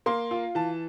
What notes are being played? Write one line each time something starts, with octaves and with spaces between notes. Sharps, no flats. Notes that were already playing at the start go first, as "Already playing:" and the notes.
A#3 C6
F4
E3 A5